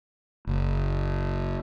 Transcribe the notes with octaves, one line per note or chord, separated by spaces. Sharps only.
F#1